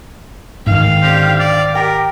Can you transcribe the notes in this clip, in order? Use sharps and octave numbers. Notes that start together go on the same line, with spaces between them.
G#2 D#3 F5 G5
D3 C4 G4
D5
G4 A#4 G5